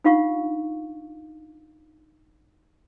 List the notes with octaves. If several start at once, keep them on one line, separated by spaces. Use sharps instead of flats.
D4 D#4 F4 F5 F#5 C#6